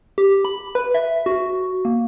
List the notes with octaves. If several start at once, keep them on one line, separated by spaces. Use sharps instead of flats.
G4
B5
B4
E5
F#4
A#3